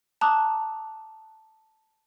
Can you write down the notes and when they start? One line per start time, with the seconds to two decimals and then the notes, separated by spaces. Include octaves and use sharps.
0.21 A5 A#5 D6 D#6 F#6